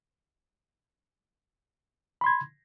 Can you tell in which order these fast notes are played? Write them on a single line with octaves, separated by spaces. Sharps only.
B5 C6 G#6